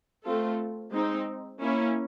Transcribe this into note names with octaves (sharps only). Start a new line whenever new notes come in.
A3 C4 F4 A4
G#3 C4 D#4
A#3 C#4 E4